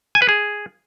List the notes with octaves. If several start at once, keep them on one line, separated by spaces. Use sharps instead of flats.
G#5
B4
G#4